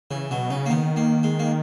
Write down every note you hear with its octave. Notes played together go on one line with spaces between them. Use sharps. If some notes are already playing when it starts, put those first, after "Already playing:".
C#3 E3
B2 F#3
C#3 D#4
A#3
D#3 B3
A#3
G#3
A#3